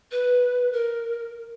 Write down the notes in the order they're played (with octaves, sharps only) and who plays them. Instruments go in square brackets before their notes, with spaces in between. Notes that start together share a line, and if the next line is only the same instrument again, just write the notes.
[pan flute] B4
A#4